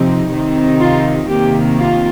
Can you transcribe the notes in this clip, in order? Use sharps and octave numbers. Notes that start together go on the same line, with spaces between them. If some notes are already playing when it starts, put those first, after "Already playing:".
Already playing: C3 F3 C4 D#4
C3 D#3 C4 D#4
F4
C3 D#3 A#3 G4
F4